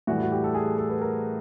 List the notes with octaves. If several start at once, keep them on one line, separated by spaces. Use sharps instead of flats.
A2 E3 G3 F#4
F#4
G4
A4
G#4
A4
B4
A#4